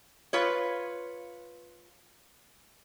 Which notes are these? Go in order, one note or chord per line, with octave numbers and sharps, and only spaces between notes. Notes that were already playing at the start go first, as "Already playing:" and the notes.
F4 B4 C#5